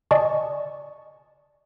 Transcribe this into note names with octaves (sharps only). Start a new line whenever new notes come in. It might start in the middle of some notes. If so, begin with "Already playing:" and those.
D5 D#5 G#5 A5 C#6